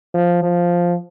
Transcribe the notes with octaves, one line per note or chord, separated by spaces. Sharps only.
F3
F3